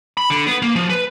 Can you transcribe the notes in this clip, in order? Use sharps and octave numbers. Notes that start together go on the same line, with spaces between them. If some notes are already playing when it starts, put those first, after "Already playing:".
B5
D3
B3
A#3
F3
B4